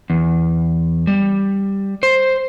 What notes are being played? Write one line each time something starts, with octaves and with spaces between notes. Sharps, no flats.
E2
G3
C5